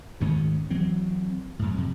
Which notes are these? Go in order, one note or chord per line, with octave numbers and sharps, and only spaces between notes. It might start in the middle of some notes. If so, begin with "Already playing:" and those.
D2 G#2 D#3 C#4
E3 F#3 C4
F#2 A2
F2 C3